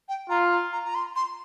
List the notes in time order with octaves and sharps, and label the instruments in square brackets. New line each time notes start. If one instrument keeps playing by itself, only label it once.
[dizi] G5
[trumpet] F4 [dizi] A#5
[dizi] A#5
A#5
A#5
C6
C6